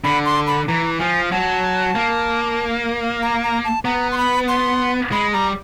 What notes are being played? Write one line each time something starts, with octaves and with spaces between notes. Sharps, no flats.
D3 B5
C6
B5
E3 A#5
F3 G#5
F#3 A5
A#3
A#5
A#5
A5
B3 A#5
C6
B5
C6
G#3 B5
G3 A#5